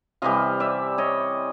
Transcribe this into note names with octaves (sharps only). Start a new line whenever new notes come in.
C3 E3 G3 D#5 F5
D5 E5
C#5 D#5